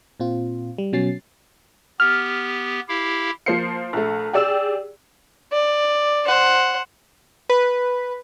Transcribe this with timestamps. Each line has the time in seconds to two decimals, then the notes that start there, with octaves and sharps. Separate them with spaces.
0.20 A#2 C4 F4
0.78 G3
0.93 B2 F#3 C#4 A6 C7
2.00 B3 G4 F6
2.88 E4 G4 F5
3.46 F3 A#3 C5 C7 C#7
3.93 A#1 A3
4.33 G4 G#4 D5 E6
5.52 D5
6.27 C5 F#5
7.49 B4